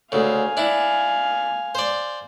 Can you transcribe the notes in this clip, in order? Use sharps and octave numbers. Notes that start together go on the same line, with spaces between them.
D2 C#3 F5 G#5
D4 E4
C5 D5